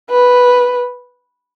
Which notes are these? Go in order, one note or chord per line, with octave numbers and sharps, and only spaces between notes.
B4